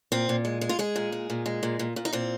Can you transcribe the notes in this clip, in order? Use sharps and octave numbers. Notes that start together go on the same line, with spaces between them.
A#2 C4
A#2
G#3
G#3
F4
G#3 G#4
A#2
G#3
A#2
G#3
A#2
A#2
A#2
D#4
A#2 C4